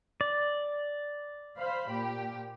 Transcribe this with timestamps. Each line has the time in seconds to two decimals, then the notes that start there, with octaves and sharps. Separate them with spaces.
0.21 D5
1.59 C5 F5 B5
1.90 A#2 G4